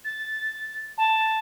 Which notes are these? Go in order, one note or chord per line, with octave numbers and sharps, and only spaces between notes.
A6
A5